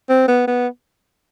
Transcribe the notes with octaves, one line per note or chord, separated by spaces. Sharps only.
C4
B3
B3